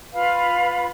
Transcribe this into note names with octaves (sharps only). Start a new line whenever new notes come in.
F4 B4 F5 B5